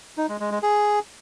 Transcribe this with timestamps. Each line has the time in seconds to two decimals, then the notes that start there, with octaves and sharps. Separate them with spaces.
0.17 D#4
0.29 G#3
0.40 G#3
0.51 G#3
0.63 G#4